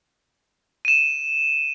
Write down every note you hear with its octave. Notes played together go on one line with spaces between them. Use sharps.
D#7 E7